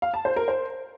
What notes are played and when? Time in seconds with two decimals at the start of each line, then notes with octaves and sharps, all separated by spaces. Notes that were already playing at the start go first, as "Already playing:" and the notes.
0.02 F5
0.14 A5
0.25 C5
0.36 A#4
0.48 C5